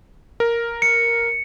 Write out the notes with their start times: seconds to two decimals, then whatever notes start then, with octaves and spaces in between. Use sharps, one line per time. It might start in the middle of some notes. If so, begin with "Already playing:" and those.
0.40 A#4
0.82 C#7